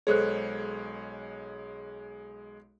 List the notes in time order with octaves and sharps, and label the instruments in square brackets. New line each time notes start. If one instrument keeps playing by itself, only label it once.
[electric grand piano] B1 G#3 C#5 [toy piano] G#4 A4 C5